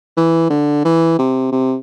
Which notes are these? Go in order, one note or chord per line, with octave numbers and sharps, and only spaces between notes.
E3
D3
E3
C3
C3